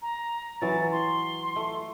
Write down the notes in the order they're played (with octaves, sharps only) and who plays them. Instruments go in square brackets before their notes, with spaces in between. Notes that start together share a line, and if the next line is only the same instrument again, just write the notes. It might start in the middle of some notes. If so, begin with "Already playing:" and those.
[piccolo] A#5
[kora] E3 F#3 [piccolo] A6
[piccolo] C6
[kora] A3